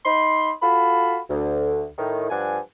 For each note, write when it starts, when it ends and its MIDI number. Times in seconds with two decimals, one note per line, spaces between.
0.05 0.51 63
0.05 0.51 83
0.05 0.51 84
0.62 1.18 65
0.62 1.18 66
0.62 1.18 69
0.62 1.18 83
1.29 1.86 38
1.98 2.29 45
1.98 2.29 51
2.30 2.58 43
2.30 2.58 53
2.30 2.58 74
2.30 2.58 78
2.30 2.58 80